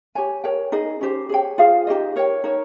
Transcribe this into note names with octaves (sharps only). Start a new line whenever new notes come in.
G4 C#5 G#5
A#4 C#5 G5
D#4 G#4 D#5
C#4 G4 C5
G#4 C#5 G5
F4 G#4 C5 F5
D#4 G4 C5 D#5
A#4 C#5 G5
D#4 A#4 C#5